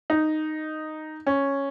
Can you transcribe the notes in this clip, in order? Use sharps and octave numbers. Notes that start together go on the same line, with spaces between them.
D#4
C#4